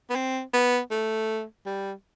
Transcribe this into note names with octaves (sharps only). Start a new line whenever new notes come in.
B3
C4
B3
A3
G3